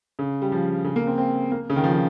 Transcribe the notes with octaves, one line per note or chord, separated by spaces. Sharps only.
C#3
G3
F3
C#3
A#3
C4
C4
A#3
C#3
D#3
F3
D#3